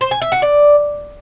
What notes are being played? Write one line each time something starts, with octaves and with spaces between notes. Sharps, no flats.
C5
G#5
E5
F#4
D5